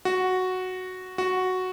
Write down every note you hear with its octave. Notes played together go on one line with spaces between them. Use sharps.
F#4
F#4